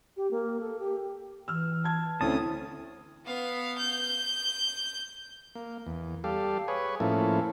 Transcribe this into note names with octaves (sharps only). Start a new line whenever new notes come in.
G4
A#3
A4
G4
E3 E6 F6
A5 G#6
D2 C4 C#4 E4 A5 D#6
B3 F5
G6
A#3
E2
G3 G4 A4 F5
G#4 B4 C#5
A2 F3 A#3 C#4 E4 A4